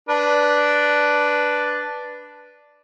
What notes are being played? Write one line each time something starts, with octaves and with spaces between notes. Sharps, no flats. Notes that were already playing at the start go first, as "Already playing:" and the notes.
D4 B4